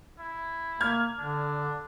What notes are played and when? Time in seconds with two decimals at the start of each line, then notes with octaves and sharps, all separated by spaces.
0.19 E4
0.81 A#3 F6 G#6
1.18 D3 D4